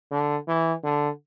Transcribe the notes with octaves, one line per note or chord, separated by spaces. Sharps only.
D3
E3
D3